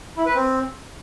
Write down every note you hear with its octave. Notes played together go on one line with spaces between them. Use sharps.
E4
B4
C4